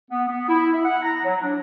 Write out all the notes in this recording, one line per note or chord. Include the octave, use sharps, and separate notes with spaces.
B3
B3
E4
E5
F#5
A#5
F#3
D4